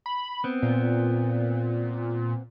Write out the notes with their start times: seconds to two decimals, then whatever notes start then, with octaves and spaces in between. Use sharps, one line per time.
0.06 B5
0.44 B3 C4
0.62 A#2